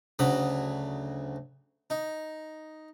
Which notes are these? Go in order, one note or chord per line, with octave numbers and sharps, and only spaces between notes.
D2 C#3 F#3 B5 D#6
D#4